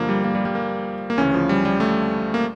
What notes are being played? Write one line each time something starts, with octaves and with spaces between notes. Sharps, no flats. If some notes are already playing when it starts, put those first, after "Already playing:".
Already playing: G2 D3 F3 A#3
G3
A#3
G3
G3
A#3
A#3
D2 C#3 E3 C#4
F3
G3
G3
A3
A#3